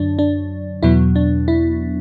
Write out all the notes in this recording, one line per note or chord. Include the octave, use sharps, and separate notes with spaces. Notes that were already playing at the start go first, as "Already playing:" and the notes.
Already playing: F#2 D3 F#3 D4
D4
E2 B2 F#3 B3 E4
D4
E4